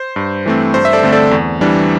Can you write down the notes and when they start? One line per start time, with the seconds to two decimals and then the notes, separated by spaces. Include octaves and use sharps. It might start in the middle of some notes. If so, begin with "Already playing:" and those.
Already playing: C5
0.16 G2
0.46 E3 A3 C4
0.74 G2 C5
0.85 E5
0.93 A4 D5
1.03 D3 A3 C4
1.12 A4 D5
1.31 E2
1.61 E3 G3 D4